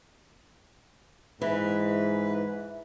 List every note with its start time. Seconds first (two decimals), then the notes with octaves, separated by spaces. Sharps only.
1.42 G#2 E3 B4 E5